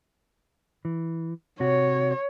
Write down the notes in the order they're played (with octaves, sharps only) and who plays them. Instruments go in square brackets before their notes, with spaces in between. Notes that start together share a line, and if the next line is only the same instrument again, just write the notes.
[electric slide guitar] E3
[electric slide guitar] C3 F#4 [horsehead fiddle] C#5